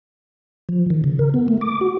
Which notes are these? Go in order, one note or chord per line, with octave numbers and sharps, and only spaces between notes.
F3
D#3
C#3
A#4
B3
A3
D6
F#4